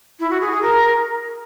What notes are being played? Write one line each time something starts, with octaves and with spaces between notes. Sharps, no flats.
E4
F#4
G#4
G#4
A#4